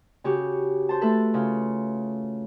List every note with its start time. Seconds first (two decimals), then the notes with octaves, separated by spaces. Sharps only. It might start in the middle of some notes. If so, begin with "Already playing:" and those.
0.24 C#3 F#4 G4
0.89 C5 A5
1.01 A3 A4 B4
1.34 C#3 F4